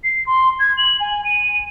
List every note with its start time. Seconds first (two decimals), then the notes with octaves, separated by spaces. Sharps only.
0.04 C7
0.26 C6
0.59 G#6
0.77 F#7
1.00 G#5
1.24 D#7